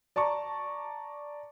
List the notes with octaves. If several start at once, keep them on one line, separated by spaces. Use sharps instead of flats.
D5 A5 A#5 C#6